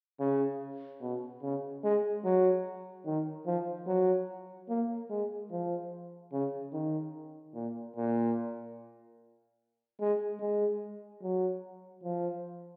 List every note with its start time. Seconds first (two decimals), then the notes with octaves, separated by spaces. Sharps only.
0.20 C#3
1.01 B2
1.42 C#3
1.84 G#3
2.25 F#3
3.06 D#3
3.46 F3
3.87 F#3
4.69 A#3
5.10 G#3
5.51 F3
6.32 C#3
6.73 D#3
7.55 A#2
7.96 A#2
10.00 G#3
10.40 G#3
11.23 F#3
12.04 F3